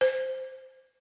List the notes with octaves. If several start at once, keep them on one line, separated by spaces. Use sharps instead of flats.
C5